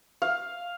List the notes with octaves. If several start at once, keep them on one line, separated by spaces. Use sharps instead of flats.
F5